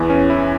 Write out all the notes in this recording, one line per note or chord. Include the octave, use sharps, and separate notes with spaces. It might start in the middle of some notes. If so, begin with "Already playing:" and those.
Already playing: E2 E3
C#4
E4